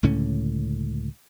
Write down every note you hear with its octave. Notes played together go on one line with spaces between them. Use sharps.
C#2 A2 D3 C#4